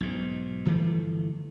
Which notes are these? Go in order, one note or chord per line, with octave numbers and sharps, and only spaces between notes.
B1 G#2
G1 E3 F3 A3